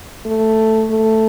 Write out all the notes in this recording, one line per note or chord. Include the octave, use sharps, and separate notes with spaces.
A3
A3